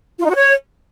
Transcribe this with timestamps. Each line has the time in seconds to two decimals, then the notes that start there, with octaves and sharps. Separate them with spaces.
0.19 F4
0.24 D#4
0.29 F#4
0.35 C#5